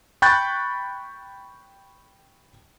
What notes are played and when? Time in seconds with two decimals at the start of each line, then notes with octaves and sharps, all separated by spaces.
0.22 G5 B5 C#6 F#6 G6 A6